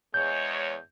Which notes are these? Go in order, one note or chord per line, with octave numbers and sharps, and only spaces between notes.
E2 G#3 C#5 G6